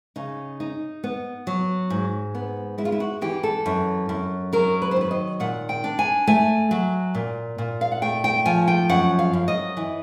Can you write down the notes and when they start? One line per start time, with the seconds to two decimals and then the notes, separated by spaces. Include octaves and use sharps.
0.16 C#3 D#4
0.60 D#4
1.04 B3
1.47 F#3
1.90 G#2
2.35 B3
2.78 G#3 E4
2.85 F4
2.92 E4
3.00 F#4
3.22 E3 G4
3.43 A4
3.66 F#2
4.09 F#2
4.53 F#3 A#4
4.82 B4
4.91 C5
4.96 D#3 B4
5.11 D#5
5.40 A#2 F#5
5.69 G5
5.84 D4
5.99 G#5
6.27 A3 G#5
6.71 F#3
7.15 A#2
7.58 A#2
7.81 F5
7.92 F#5
8.02 A3 G5
8.24 G5
8.45 F3 G#5
8.68 G5
8.89 F#2 F#5
9.19 F5
9.33 F#2
9.48 D#5
9.77 E3